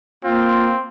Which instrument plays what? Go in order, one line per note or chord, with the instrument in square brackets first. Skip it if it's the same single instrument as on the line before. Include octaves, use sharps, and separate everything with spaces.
[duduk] A#3 [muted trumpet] C4 [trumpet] F4